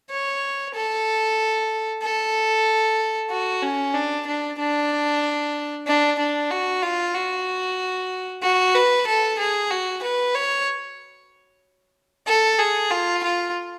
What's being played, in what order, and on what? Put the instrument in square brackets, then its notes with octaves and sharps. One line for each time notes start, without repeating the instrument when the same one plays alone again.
[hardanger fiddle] C#5
A4
A4
F#4
C#4
D4
D4
D4
D4
D4
F#4
F4
F#4
F#4
B4
A4
G#4
F#4
B4
C#5
A4
G#4
F4
F4